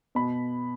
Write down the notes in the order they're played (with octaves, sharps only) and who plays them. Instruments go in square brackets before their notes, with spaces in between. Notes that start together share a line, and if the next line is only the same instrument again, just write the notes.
[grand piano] B2 B5